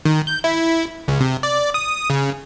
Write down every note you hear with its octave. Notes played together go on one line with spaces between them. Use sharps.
D#3
G6
E4
C#2
C3
D5
D#6
C#3